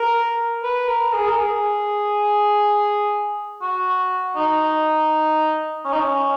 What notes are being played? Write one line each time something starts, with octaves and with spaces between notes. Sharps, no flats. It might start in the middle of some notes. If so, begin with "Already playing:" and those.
Already playing: A#4
B4
A#4
G#4
A#4
G#4
F#4
D#4
C#4
D#4
C#4